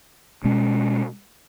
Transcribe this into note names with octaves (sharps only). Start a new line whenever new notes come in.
B2 G#3 C#4